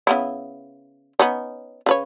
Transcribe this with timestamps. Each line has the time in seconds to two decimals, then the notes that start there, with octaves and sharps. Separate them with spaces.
0.07 C#3 B3 E4
1.19 B3 C#4 D#4
1.86 C#3 B4 C#5